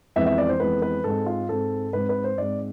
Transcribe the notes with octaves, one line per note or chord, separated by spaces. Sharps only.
F2 E3 G#3 B3 E5
E5
D5
C5
F2 E3 G#3 B3 B4
B4
G#2 G#3 C4 A4
F4
G#2 G#3 C4 A4
G#2 G#3 C4 B4
B4
C5
G#2 G#3 C4 D5